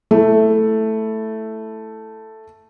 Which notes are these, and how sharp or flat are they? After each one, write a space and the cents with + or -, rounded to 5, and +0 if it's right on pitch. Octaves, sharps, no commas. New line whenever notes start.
A3 +0 E4 +0